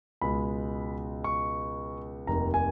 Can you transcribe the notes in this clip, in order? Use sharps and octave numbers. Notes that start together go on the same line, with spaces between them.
C#2 B2 G#3 B5
C#6
F1 D#2 D#3 A#5
G#5